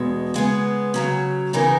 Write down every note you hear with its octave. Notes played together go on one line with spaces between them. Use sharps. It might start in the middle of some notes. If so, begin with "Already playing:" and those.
Already playing: E2 B2 G#3
C#3 G#3 B3
C#3 F#3 C#4
C#3 E3 B3 D#4 A#4